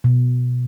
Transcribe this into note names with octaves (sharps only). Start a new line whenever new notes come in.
B2